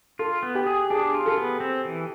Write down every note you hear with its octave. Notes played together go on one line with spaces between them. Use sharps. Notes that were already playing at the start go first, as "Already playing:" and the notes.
F4 A4
B3
G4
G#4
D4 G#4
F4
A4
B3
C4
E3